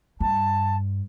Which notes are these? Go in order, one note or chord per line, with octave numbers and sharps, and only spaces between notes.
G2 A5